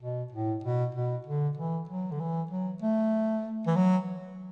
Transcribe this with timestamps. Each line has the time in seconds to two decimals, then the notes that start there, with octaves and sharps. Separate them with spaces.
0.01 B2
0.32 A2
0.64 B2
0.95 B2
1.26 D3
1.57 E3
1.89 F#3
2.11 D3
2.20 E3
2.51 F#3
2.82 A3
3.66 E3
3.75 F#3